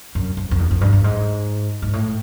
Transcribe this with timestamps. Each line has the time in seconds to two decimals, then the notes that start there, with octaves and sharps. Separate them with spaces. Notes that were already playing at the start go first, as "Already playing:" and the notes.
0.15 F#2
0.37 F2
0.51 F2
0.59 E2
0.71 F2
0.81 G2
0.93 G2
1.04 G#2
1.82 G#2
1.93 A2